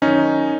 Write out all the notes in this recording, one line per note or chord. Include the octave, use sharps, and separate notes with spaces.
F#2 D#3 C#4 D#4